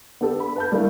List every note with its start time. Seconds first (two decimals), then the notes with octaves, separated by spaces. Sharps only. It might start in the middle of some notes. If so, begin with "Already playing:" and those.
0.21 B3 D4 G4 A4
0.40 B5
0.56 B4 A5 G6
0.72 G3 A3 A#3 D4 E4